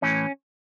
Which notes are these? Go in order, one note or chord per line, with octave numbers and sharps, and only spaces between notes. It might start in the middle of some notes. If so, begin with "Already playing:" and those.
A2 E3 C#4